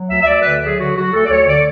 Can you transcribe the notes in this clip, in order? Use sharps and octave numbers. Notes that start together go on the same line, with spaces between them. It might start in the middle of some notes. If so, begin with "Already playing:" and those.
Already playing: F#3
D2 E5
E5
D2 D5
D3 B4
F#3 G#4
D3 F#4
F#3 F#4
D2 A4
D5
D2 C#5
D3 D5